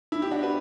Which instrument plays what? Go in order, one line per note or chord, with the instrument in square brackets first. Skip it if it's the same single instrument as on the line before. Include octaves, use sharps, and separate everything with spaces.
[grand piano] E4
G4
D4 F#4
B4